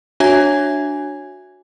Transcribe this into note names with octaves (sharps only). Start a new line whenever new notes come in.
D4 F#4 C#5 E5 G#5 G#6